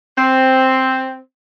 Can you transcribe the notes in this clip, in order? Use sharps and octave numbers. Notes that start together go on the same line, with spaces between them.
C4